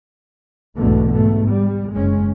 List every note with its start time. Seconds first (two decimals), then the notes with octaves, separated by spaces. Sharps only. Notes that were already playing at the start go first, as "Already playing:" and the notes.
0.77 B1 E2 G#2 B2 D3 A3
1.13 G#2 B2 A3
1.50 G3
1.93 F#1 G#3 C#4